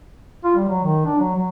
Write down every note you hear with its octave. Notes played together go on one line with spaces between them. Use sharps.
F4
G3
F#3
D#3
D4
F#3
F#3